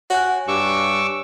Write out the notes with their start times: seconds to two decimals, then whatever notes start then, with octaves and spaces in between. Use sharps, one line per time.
0.10 F#4 C#5 G#5 F#6
0.47 G2 C#6 D6 E6